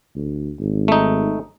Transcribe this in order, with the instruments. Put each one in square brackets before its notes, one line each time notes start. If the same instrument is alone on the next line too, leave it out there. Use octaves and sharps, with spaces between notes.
[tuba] D2
G#1
[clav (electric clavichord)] A3 D#4